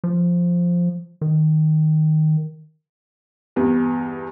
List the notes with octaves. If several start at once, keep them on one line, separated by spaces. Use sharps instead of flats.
F3
D#3
E2 G2